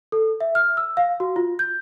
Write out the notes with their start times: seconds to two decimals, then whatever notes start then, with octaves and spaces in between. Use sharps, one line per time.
0.12 A4
0.41 E5
0.55 F6
0.77 E6
0.97 F5
1.20 F#4
1.36 F4
1.59 G6